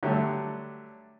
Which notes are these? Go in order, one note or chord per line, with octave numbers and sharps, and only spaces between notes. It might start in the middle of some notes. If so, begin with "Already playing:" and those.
D3 F#3 G3 A3